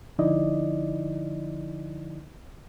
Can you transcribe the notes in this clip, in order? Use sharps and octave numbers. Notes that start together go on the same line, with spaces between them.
D3 F3 D#4 E4 D5 D#5